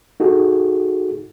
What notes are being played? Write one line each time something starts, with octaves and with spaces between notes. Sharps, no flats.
D#4 F#4 G#4 A4